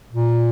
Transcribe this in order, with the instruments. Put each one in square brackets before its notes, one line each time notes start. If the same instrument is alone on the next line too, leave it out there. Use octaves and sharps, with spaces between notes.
[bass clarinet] A#2